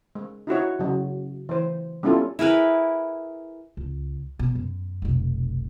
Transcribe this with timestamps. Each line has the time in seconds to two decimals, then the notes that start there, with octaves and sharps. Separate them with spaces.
0.15 G#3
0.47 D#4 E4 F#4 C#5
0.79 C#3 F#3
1.49 E3 C5
2.03 G3 B3 C#4 E4 F4 A4
2.39 E4 G#4 A#4 B4
3.77 C#2
4.39 B2
4.55 F#2
5.02 F1 B1